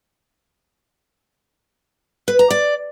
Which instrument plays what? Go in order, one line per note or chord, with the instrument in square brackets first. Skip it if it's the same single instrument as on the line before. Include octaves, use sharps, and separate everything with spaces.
[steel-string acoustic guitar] B4
A#5
D5